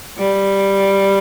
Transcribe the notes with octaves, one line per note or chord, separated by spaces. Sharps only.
G3